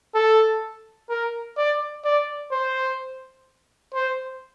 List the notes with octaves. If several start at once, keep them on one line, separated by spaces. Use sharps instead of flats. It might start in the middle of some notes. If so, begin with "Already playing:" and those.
A4
A#4
D5
D5
C5
C5